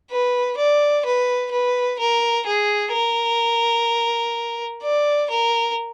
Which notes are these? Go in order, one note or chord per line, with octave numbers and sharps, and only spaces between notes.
B4
D5
B4
B4
A#4
G#4
A#4
D5
A#4